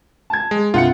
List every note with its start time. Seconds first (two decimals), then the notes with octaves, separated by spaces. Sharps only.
0.30 A5 G#6
0.51 G#3
0.74 C2 G2 F4 F#5 C#7